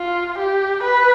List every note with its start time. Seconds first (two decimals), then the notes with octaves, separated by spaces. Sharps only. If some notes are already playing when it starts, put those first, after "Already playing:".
Already playing: F4
0.38 G4
0.83 B4